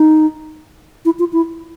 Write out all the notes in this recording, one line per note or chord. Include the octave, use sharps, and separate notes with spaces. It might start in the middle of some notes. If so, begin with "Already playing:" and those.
Already playing: D#4
E4
F4
E4